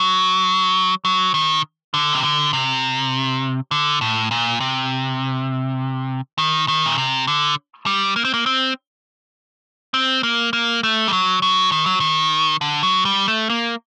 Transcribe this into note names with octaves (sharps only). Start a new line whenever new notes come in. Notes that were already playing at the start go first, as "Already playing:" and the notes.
Already playing: F#3
F#3
D#3
D3
C3
D3
C3
D3
A2
A#2
C3
D#3
D#3
A#2
C3
D3
G3
A#3
C4
A#3
C4
C4
A#3
A#3
A3
G3
F#3
F#3
D#3
F#3
D#3
D3
F#3
G3
A3
A#3